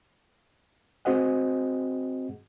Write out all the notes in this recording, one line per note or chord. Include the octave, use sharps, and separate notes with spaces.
C4 F#4 G#4 C5 D#5 F#5